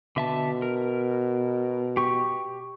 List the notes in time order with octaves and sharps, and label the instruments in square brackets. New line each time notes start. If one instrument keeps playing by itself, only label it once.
[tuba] B2 [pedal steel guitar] D3 E5 A5
[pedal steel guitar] A#4
G4 C#6